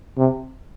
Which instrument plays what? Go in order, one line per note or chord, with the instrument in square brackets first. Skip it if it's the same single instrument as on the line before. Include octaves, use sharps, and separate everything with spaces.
[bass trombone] C3